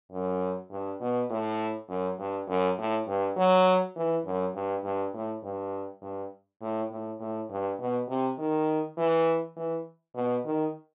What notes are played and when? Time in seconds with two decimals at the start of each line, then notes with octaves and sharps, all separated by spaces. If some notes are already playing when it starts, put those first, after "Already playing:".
0.12 F#2
0.70 G2
1.00 B2
1.30 A2
1.88 F#2
2.18 G2
2.48 F#2
2.78 A2
3.07 G2
3.36 F#3
3.96 E3
4.25 F#2
4.54 G2
4.84 G2
5.13 A2
5.43 G2
6.02 G2
6.61 A2
6.90 A2
7.20 A2
7.50 G2
7.79 B2
8.09 C3
8.38 D#3
8.97 E3
9.56 E3
10.15 B2
10.45 D#3